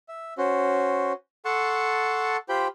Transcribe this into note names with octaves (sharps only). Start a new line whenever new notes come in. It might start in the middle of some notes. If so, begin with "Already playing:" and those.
E5
C#4 F#4 C5
A4 F#5 A5 C6 C#6
F4 G4 C5 G5 B5